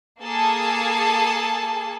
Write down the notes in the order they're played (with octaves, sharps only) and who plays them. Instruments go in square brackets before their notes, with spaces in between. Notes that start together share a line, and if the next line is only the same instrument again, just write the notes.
[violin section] A#3 G#4 A4 G#5 A5